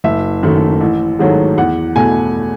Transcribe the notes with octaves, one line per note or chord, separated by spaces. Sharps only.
F#1 E5
F#2 D#3 A3
A1
G#2 D#3 F#3 A3
E2 F#5
B2 A3 G#5